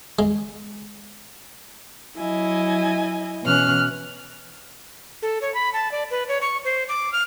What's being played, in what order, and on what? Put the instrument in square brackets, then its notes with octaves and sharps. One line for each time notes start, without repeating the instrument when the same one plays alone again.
[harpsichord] G#3
[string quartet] F#3 E4 D#5 G#5
B2 E3 C#4 F6 F#6
[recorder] A4
C#5
B5
A5
D5
B4
C#5
C#6
C5
D6
F6